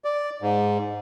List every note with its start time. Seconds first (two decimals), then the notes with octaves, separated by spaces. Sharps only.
0.04 D5
0.42 G#2